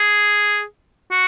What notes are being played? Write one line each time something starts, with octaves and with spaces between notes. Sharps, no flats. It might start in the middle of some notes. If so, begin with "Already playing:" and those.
Already playing: G#4
F#4